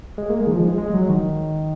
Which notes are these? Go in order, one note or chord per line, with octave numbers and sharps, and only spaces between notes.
G#3
A#3
G#3
D#3
F3
G#3
G#3
F#3
D#3